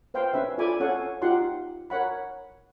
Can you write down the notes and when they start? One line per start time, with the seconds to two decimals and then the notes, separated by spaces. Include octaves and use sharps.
0.14 B4 C5 F5 G5 C6
0.33 C#4 B4 E5
0.58 F4 A4 D5 G#5 B5 D6
0.80 C#4 A4 C#5 F5 F#5 G#5
1.22 D#4 F4 G4 F#5 C6
1.90 A#4 C#5 F#5 B5